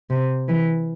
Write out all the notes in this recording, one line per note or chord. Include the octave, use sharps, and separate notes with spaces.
C3
E3